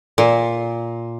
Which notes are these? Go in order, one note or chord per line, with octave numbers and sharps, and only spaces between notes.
A#2